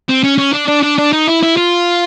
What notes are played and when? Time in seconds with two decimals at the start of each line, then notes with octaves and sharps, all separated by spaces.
0.09 C4
0.23 C#4
0.38 C#4
0.53 D4
0.68 D4
0.83 D4
0.98 D4
1.13 D#4
1.28 E4
1.43 E4
1.57 F4